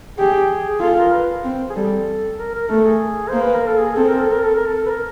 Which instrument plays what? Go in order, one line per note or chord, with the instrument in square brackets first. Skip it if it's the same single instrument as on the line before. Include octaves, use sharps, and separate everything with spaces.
[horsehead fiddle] G4 [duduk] G#4
[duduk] G#4
[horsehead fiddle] F4 [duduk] A4
[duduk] A#4
B4
[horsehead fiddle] C4
[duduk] G#4
[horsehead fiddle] G3 [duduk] A4
[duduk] A#4
A#4
[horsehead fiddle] A3 [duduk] A4
[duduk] G#4
[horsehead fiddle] A#3 [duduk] C5
[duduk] B4
A#4
A4
G#4
[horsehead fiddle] C4 [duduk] A4
[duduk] A#4
A4
A#4
A4
A#4
A4
B4
A#4